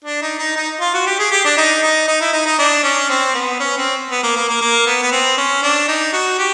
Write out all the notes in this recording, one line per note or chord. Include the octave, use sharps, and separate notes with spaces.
D4
D#4
D#4
D#4
F4
F#4
G4
G#4
G4
D4
D#4
D#4
D#4
E4
D#4
D#4
D4
C#4
C4
B3
C#4
C4
B3
A#3
A#3
A#3
A#3
B3
B3
C4
C#4
D4
D#4
F#4
G4